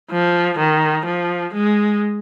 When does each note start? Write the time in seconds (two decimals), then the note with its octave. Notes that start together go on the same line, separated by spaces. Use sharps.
0.10 F3
0.58 D#3
1.06 F3
1.54 G#3